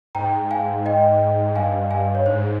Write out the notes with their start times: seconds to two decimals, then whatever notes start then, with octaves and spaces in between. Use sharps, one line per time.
0.15 G#2 G5 A#5
0.51 F5 G#5
0.86 D#5 G5
1.56 G2 F5 G#5
1.91 F5 G#5
2.15 C#5
2.26 G#2 C5